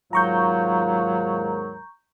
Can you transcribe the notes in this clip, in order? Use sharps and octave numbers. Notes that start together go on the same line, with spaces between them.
D#2 G#2 F#3 F4 A#4 A#5 C#6 G6